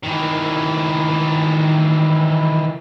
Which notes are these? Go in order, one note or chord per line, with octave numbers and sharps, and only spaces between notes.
D#3 E3